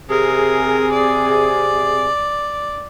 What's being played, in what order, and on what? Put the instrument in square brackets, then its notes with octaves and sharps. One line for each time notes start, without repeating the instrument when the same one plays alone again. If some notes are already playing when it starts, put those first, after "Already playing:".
[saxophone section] C3 G#4 [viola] A#4
[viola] D5